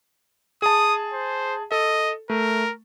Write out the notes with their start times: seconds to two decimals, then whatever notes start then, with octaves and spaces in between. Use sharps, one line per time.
0.62 G#4 A5 D#6
1.13 C5
1.72 A4 D#5
2.30 A3 A#4